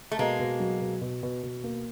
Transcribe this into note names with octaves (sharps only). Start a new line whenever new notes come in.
A3
B2 G#3 A#3
B2
F#3
B2
B2
B2
B2
A#3